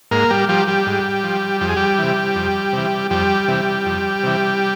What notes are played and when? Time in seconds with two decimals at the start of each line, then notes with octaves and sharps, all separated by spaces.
0.11 G#2 A#3 A#4
0.30 G3 G4
0.49 F3 G3 G4
0.68 G3 G4
0.86 G#2
1.24 F3
1.61 F2 G4
1.69 G#4
1.76 G3 G4
1.98 C3 E3
2.35 F2
2.73 C3 E3
3.10 F2 G3 G4
3.48 C3 E3
3.85 F2
4.23 C3 E3